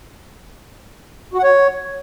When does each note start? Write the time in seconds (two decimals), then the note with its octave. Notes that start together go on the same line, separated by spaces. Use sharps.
1.34 F#4
1.39 F#5
1.44 C#5